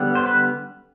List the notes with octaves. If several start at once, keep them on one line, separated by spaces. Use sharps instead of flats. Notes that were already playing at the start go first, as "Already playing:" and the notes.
Already playing: D3 G3 B3
C5
B4